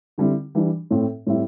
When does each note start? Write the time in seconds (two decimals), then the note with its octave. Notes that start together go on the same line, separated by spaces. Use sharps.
0.18 D3 G3 C4 E4
0.55 E3 G3 D4
0.91 A2 A3 C4 E4
1.27 A2 G3 C4 E4